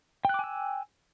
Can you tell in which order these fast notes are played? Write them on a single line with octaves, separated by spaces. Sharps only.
G5 F#6 D6 G#5 E6